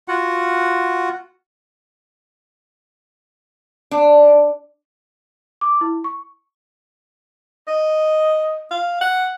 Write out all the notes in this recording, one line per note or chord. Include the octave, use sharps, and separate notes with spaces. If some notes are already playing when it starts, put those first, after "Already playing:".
F4 F#4 F#5
D4
D6
E4
C#6
D#5
F5
F#5